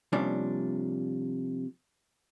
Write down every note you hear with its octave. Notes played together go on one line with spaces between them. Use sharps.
C3 F3 G3 A#3 C#4 D4